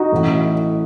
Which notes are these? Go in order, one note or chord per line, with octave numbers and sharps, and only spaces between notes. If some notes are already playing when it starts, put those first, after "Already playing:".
Already playing: D#4 F#4
A1 A2 E3